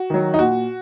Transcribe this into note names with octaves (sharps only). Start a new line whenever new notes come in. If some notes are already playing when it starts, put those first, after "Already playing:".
Already playing: F#4
D#3 F#3
D#4
A#2 F#4